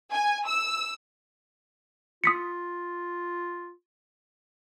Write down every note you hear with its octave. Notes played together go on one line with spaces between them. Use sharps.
G#5
E6
F4 D#6 B6 C#7